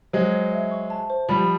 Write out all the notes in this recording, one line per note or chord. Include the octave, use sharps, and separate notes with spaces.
F#3 G#3 C5
C5
E5
C#6
A5
C5
F3 G3 B5